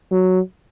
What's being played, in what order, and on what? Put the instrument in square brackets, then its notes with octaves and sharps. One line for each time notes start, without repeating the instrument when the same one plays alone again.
[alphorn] F#3